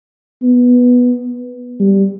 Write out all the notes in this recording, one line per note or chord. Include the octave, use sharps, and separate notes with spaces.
B3
G3